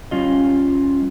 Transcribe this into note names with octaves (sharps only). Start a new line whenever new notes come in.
G3 C#4 F4 D#5